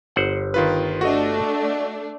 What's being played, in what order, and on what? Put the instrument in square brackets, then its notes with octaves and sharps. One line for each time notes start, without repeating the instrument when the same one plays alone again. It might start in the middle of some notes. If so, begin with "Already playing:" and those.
[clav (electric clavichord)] G1 C5 F#5
[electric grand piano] D#3 F4 B4
[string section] A3 D4 [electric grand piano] F#4 D#5